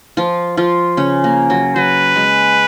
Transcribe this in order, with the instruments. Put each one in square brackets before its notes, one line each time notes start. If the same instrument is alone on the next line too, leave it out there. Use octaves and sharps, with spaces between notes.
[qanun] F3 F4
F3 F4
C#3 C#4
A#3
F#3
[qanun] F#3 [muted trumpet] B4
[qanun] G#3